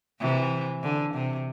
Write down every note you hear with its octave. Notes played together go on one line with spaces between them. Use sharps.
C3 E3
D3
C3